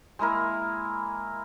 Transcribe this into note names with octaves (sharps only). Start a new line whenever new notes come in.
G#3 A#3 E4 A#4